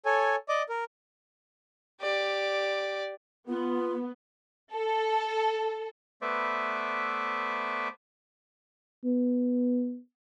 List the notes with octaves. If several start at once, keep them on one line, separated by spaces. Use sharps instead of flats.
A4 C#5 G#5
D5 D#5 D6
A#4
G4 D5
B3 F4
A4
A3 B3 B4 C5 D5 E5
B3